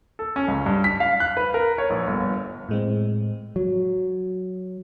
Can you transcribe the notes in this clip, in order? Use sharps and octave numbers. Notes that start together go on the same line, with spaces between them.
A4
C#4
C#2
G2
B6
F5
F#6
B4
A#4
C#5
A#1
G1
A2 G#3 C4
F#3